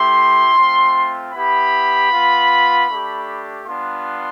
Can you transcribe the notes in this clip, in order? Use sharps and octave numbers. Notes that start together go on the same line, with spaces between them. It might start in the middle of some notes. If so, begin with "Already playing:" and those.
Already playing: A3 E4 G4 C6
A3 C4 F4
B3 E4 G4 B5
B3 F4
A3 D4 G4
G3 B3 D4 F4 C6